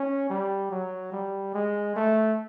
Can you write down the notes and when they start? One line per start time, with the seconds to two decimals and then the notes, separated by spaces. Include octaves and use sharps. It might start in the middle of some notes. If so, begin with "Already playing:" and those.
Already playing: C#4
0.30 G3
0.71 F#3
1.12 G3
1.54 G#3
1.96 A3